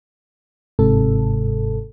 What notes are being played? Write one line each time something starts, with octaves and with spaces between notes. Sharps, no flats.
G1 G#2 C3 A4